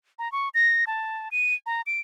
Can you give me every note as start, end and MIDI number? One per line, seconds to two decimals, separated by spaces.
0.19 0.31 82
0.32 0.49 85
0.54 0.85 94
0.87 1.29 81
1.31 1.54 99
1.66 1.81 82
1.87 2.01 98